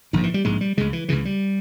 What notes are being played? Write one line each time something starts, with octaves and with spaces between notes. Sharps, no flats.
A#1 G#2 D#3
E3
G3
A#1 G#2 G#3
G3
C#2 C#3 G#3
E3
C#2 C#3 E3
G3